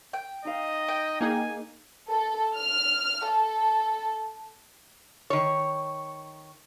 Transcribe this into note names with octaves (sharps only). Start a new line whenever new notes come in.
G5
D#4 D#5 F5
G5
A#3 D#4 G#4 G#5
A4
F6
A4
D#3 C#5